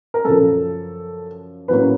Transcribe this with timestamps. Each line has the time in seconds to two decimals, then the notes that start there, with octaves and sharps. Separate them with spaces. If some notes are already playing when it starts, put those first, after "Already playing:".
0.14 A#4
0.25 F#2 C#3 F3 A4
1.68 A2 F#3 A#3 C#4 B4